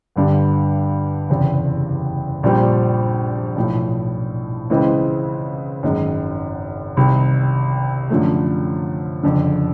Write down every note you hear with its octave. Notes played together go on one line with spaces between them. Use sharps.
G1 G2 D3 G3
F#1 E2 C3
A#1 A#2 G3 C4
B1 A2 F3
C#2 C#3 E3 G#3 C4
G#1 F#2 D#3 G#3
C2 C3 D#3
F#2 D3 F3 A3
F#1 F2 D3